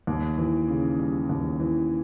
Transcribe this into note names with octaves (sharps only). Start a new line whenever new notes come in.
D#2
E3
C#3
G3
D#2
E3